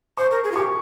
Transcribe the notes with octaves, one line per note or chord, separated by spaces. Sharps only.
C5 C#6
A#4
G#4
F4
G4 C#6